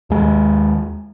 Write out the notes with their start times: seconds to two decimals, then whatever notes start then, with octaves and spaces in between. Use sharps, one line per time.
0.10 D#2 G#3